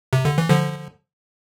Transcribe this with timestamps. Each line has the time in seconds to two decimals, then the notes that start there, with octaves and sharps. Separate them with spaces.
0.13 C3
0.25 D3
0.38 E3
0.49 D3 F3